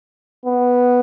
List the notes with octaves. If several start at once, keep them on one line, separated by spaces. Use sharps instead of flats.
B3